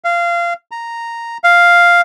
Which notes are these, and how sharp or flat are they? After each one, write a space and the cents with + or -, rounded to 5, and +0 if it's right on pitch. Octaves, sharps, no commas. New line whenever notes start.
F5 -20
A#5 -5
F5 +0